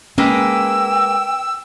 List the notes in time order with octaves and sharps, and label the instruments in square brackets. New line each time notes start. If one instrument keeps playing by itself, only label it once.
[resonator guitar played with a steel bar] G#3 A#3 B4 [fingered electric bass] C#4 [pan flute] G5 [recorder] E6